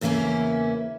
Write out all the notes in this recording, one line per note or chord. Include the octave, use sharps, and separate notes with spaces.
E2 C#3 E3 A#3 C#4 E4